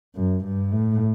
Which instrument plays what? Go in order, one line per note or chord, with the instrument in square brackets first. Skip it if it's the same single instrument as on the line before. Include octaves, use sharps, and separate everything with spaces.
[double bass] F#2
G2
A2